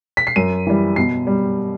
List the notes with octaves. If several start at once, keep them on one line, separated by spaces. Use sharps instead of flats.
B6
C7
F#2 D#7
E3 G3
B2 C7
G3